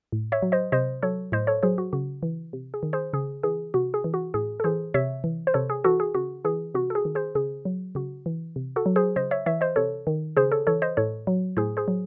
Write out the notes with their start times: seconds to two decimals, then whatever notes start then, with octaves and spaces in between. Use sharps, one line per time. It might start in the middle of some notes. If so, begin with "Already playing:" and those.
0.12 A2
0.32 C#5 E5
0.42 F#3
0.52 C5 D#5
0.72 C3 C5 D#5
1.02 F#3 A4 C#5
1.32 A2 C5 D#5
1.47 A4 C#5
1.63 F#3 G#4 C5
1.78 F#4
1.93 C#3 F#4
2.23 E3
2.53 C3
2.74 G#4
2.83 D#3
2.93 G#4 C5
3.13 C#3 G#4
3.43 E3 G#4
3.74 C3 F#4
3.94 G#4
4.04 E3
4.14 F#4
4.34 A2 G#4
4.60 A4
4.64 E3 G#4 C5
4.94 C3 C#5 E5
5.24 E3
5.47 C5
5.54 C3 A4 C#5
5.70 G#4
5.84 E3 F#4 A4
6.00 G#4
6.15 C#3 F#4
6.45 E3 G#4
6.74 C3 F#4
6.90 A4
6.95 G#4
7.05 D#3
7.15 G#4 C5
7.35 C#3 G#4
7.65 F#3
7.95 C#3 F#4
8.26 E3
8.56 C3
8.76 F#4 A4
8.86 F#3
8.96 G#4 C5
9.16 C#3 C5 D#5
9.31 C#5 E5
9.46 E3 C#5 E5
9.61 C5 D#5
9.76 C3 A4 C#5
10.07 D#3
10.37 C#3 G#4 C5
10.52 A4 C#5
10.67 E3 A4 C#5
10.82 C5 D#5
10.97 A2 A4 C#5
11.27 F#3
11.57 A2 G#4 C5
11.77 G#4 C5
11.88 F#3